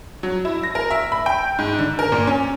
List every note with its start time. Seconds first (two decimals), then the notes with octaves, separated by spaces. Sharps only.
0.23 F#3
0.45 E4
0.63 A#6
0.75 A#4
0.90 E5
1.12 B5
1.26 G5
1.59 G#2
1.78 D3
1.99 A#4
2.12 A#2
2.27 C#4